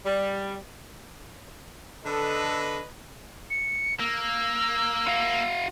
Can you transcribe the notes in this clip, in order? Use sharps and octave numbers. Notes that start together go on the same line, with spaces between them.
G3
D3 A4 B4 D#5
C#7
A#3 E6
F#4 F5